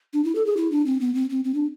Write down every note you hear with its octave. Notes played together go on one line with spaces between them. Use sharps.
D4
E4
A4
G#4
E4
D4
C4
B3
C4
C4
C4
D4